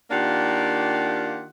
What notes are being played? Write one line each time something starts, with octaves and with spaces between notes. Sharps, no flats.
D#3 A#3 D4 F4 G4 F#5